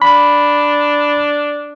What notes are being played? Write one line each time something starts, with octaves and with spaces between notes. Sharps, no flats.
D4 B5